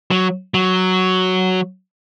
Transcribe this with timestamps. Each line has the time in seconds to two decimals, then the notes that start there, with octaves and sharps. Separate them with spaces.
0.11 F#3
0.54 F#3